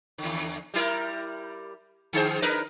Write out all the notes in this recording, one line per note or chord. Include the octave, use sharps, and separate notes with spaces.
D#2 D3
G3 E4 A#4
D3 G#4 C5
D4 A#4 B4